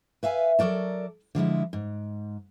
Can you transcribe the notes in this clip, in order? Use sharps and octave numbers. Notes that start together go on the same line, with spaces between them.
B4 E5 F5 G#5
F#3 A4 A#4 D5 A5
D3 F3 G#3 E4
G#2